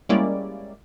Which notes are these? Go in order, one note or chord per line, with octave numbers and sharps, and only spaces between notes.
G3 G#3 A#3 C#4 E4 D5